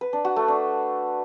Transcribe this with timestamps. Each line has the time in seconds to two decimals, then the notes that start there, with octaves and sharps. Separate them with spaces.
0.01 B4
0.13 D4
0.25 F#4
0.36 A3
0.48 D4